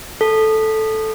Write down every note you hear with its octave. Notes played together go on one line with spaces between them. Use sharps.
A4